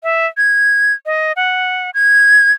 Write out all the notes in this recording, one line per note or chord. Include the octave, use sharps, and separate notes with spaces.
E5
G#6
D#5
F#5
G#6